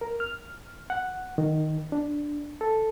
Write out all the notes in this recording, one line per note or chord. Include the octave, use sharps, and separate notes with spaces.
A#4
F6
F#5
D#3
D4
A4